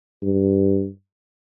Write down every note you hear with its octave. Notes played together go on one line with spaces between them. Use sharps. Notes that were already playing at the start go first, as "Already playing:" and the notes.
G2